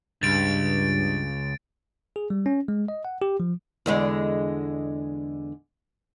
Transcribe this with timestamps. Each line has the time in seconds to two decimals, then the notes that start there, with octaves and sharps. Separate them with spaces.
0.23 C#2 G2 A6 D7
2.16 G#4
2.30 G3
2.46 C#4
2.68 G#3
2.88 D#5
3.05 F#5
3.22 G4
3.40 F3
3.86 E2 D3 G#3